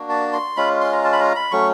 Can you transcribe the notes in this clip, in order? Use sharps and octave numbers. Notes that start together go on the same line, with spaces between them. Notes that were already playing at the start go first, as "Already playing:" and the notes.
Already playing: A#3 D4 F#4
A5
C6
G#3 C#4 F4 B5
C6
A#5
A5
B5
A#5
B5
F#3 A3 C#4 C#6